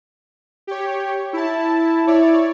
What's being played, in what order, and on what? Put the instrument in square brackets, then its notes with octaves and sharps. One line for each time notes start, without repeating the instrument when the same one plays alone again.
[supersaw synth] G4 C#5
E4 A5
[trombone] E4 [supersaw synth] C#5 D5